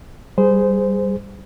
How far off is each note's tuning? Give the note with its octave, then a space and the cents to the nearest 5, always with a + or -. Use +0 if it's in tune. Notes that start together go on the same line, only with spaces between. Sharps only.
G3 +0 G#4 +0 C5 -20